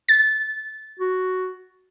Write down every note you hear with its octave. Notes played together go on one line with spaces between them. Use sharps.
A6
F#4